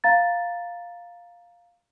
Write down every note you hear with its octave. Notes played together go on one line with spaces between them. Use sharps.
F5 A#5 A6